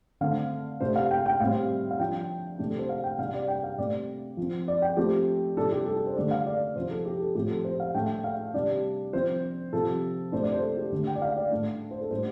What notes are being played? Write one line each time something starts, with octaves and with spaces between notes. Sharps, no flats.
D3 A3 C4 F5
C3 A3 D4 C5
F5
G5
G5
A2 G3 C4 F5
F5
F3 D4 G5
C3 A3 D4
A4
C5
F5
G5
C3 G3 D4 F5
D5
G5
F5
C3 A3 C4 D5
F3 C4
D5
G5
F3 A3 C4 G4
C3 G3 D4 A4
G4
A4
A4
C5
D3 A3 D4 D5
F5
D5
C3 F3 C4 C5
A4
G4
A4
A2 F3 C4 G4
A4
C5
F5
A2 A3 D4 G5
F5
C3 G3 D4 D5
F3 C4 C5
C3 F3 C4 A4
C3 A3 D4 C5
D5
C5
A4
G4
D3 A3 D4
G5
D5
F5
D5
A2 A3 D4
C5
A4
A2 G3 D4 C5